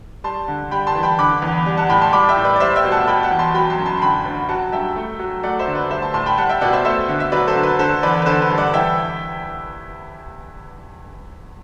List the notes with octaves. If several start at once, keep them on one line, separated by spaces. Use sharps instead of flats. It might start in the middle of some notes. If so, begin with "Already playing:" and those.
G3 A5 C6
D3
G3 G5 B5
A5 C6
E3
G5 B5
D3 B5 D6
E2
G3
F#5 A5
A2 G5 B5
A5 C6
G3 B5 D6
E5 G5
A2
B4 D5
D5
G3 C5 E5
E5 G5
B2
F#5 A5
B2 G5 B5
F#5 A5
E2
A5 C6
F#3 G5 B5
A5 C6
F#2
A5 C6
C6
D3 G5 B5
D2
F#3 F#5 A5
G2 E5 G5
A3
F#3
A3 D5 F#5
C5 E5
D3
B4 D5
G3 C5 E5
A5 C6
A2 A5 C6
G5 B5
G3 F#5 A5
E5 G5
B2 D5 F#5
C5 E5
A3 C5 E5
D3
E5
F#3 B4 D5
A4 C5
D3
B4
D3 A4 C5
E2 B4 D5
B4
D3 A4 C5
B4
G2
D5 F#5
E3 E5 G5